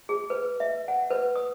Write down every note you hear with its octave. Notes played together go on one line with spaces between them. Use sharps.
G#4
B4
E5
F#5
B4
D#6